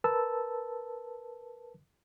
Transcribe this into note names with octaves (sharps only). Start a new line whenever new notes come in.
A#4 B4 A5 E6